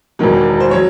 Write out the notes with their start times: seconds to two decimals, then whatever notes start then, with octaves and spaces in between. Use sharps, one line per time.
0.19 E1 E2 D#3 F#3
0.60 C5
0.71 F#3 C#5